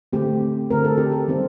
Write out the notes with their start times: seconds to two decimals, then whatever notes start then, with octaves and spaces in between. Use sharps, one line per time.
0.13 D3 A3 C4 G4
0.70 D3 A3 C4 A#4
0.85 A4
0.98 G4
1.12 A4
1.28 D#3 G3 C4